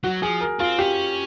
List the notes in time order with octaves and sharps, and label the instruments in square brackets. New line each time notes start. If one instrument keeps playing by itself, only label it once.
[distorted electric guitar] F#3 [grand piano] F#4
[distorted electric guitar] F3 [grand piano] G#4
[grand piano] A#4
[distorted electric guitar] C4 [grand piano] F4
[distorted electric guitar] C#4 [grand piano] G4